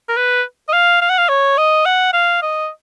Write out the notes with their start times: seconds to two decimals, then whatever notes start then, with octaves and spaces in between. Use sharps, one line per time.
0.09 A#4
0.17 B4
0.69 D#5
0.73 F5
1.02 F5
1.10 F#5
1.18 F5
1.29 C#5
1.58 D#5
1.86 F#5
2.13 F5
2.42 D#5